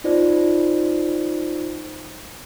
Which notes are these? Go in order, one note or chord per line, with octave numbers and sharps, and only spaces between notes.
D#4 F4 C5 D5